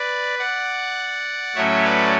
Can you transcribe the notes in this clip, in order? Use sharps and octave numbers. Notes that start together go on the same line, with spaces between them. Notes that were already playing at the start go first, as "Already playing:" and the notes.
Already playing: B4 D5
D5 F#5
A2 F#3 A3 C#4 C#5 E5
B4 D5